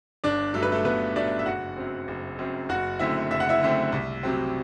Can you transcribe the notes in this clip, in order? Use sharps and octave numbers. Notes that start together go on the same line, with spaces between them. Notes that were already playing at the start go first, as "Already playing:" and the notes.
G1 D4 D5
G2 F#3 A3 D4 A4
B4
A3 A4
G1 B3 B4
G2 F#3 A3 D4 D5
E5
F#1 F#4 F#5
F#2 F#3 C4
F#1
F#2 F#3 C4
F#1 F#4 F#5
F#2 D3 A3 C4 E4 E5
F#1 E5
F#5
E4 E5
F#2 D3 A3 C4
C2
C3 F#3 C4